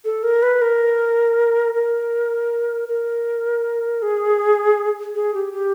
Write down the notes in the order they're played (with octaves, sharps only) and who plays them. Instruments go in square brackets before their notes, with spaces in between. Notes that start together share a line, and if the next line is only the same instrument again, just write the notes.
[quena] A4
A#4
B4
A#4
A#4
A#4
G#4
G#4
G4
G4